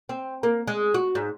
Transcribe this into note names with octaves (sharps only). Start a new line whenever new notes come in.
C4
A#3
G#3
F#4
G#2